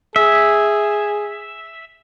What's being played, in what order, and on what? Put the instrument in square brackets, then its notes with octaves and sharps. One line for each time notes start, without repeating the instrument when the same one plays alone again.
[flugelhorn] G#4 [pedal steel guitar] E5